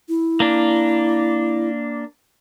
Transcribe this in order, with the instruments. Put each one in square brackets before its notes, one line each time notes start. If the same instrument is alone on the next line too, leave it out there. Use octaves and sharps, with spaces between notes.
[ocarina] E4
[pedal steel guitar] A#3 D4